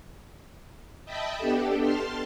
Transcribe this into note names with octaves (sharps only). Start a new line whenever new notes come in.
D#5 E5 G5 A5 B5
B3 D4 G4 A4
A5 C6 F6